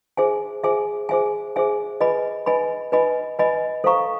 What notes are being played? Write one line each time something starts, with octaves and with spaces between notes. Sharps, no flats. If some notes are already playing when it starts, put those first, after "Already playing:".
G#4 C5 E5 G#5
G#4 C5 E5 G#5
G#4 C5 E5 G#5
G#4 C5 E5 G#5
B4 D#5 G#5 B5
B4 D#5 G#5 B5
B4 D#5 G#5 B5
B4 D#5 G#5 B5
A4 C5 F5 A#5 C#6